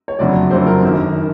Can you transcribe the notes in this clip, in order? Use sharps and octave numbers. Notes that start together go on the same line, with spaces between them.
C#5
F#1 F2 D3 F#3 A3 D5
F#1 F2 D3 F#3 A3 C5
A#4
G#1 F#2 D#3
D#3